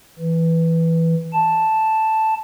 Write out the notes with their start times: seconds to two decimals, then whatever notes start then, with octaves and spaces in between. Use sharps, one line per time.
0.19 E3
1.33 A5